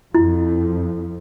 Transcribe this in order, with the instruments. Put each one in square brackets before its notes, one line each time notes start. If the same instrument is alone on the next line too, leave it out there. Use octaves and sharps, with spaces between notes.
[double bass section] F2 [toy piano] E4